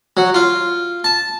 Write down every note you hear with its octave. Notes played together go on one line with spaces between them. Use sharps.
F#3
F4
A5